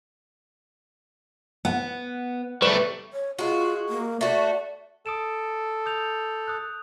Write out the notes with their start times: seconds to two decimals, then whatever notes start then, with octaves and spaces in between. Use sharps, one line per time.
1.65 B3 F#5
2.62 G3 A3 B4 C#6 E7
3.12 C#5
3.38 G#3 F4 F#4
3.89 A#3
4.21 A3 F#4 D5
5.06 A4 D#6 D7 E7
5.86 D#6 G6 F7
6.48 D#6 F#6